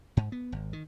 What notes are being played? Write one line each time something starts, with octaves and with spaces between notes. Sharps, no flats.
G#2
B3
G#1
D#3